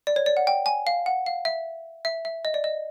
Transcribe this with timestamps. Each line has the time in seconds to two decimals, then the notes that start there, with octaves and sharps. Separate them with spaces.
0.07 D5
0.16 C#5
0.26 D5
0.37 F#5
0.47 G5
0.66 G#5
0.87 F5
1.06 F#5
1.26 F5
1.45 E5
2.05 E5
2.25 E5
2.45 D#5
2.54 D5
2.64 D#5